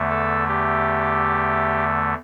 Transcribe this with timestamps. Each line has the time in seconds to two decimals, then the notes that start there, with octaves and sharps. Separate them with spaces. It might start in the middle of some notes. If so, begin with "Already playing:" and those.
Already playing: E2 D3 A3
0.10 A4
0.48 G4